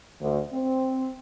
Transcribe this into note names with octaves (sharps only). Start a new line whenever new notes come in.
D2
C4